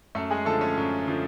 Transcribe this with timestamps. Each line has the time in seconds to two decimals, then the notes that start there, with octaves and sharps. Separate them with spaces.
0.15 F#2 A3 A4
0.30 G#3 G#4
0.45 D3 F3 A3 A4
0.61 C#4 C#5
0.77 F#2
1.08 D3 F3